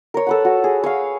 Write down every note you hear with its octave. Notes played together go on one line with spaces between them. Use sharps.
A#4 C#5
A4 B4 F#5
F#4
G#4
C#5 F5